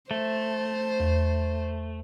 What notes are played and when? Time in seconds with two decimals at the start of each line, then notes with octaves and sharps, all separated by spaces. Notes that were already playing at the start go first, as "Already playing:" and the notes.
0.11 A3 C5
1.00 E2